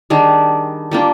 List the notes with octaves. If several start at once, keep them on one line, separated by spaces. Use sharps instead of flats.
D#3 G3 D4 G#4
G3 A#3 D4 F4